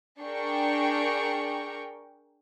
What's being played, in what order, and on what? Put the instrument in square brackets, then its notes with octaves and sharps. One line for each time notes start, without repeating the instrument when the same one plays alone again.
[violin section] D4 G#4 A#4 G5 C#6